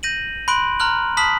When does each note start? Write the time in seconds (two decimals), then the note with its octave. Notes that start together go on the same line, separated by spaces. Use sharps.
0.03 G6 A#6 D#7 F#7
0.48 B5 C6 F#6 D7 F#7
0.80 A#5 C6 F6 F#6 F#7
1.17 A5 B5 D#6 F6 B6 F#7